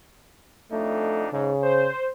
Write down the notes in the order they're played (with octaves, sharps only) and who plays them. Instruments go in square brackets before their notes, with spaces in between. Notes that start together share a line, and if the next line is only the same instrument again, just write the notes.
[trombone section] F2 D4 D#4 [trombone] A3
[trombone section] G#2 [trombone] C#3
[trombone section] C5